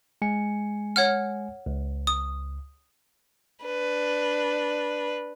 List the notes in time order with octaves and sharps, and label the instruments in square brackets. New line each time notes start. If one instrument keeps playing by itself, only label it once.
[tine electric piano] G#3 G#5 C#7
[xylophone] C#5 F#5 F6
[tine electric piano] C#2
[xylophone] D#6
[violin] D4 B4